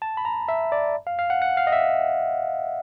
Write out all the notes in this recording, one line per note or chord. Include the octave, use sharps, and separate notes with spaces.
A5
B5
A#5
E5
D5
F5
F5
F#5
F#5
F5
D#5
E5